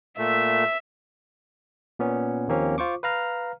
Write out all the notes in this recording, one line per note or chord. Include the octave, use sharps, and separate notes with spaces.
A#2 A3 E5
A#2 B3 C#4
D#2 F3 A#3 C4 C#4
F4 C5 C#6 D6
B4 F5 A#5 F6